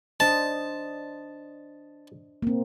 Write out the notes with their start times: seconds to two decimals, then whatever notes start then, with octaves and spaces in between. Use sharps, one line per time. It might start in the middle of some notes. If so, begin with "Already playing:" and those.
0.20 D4 C5 D#5 A5
2.43 A#3 C4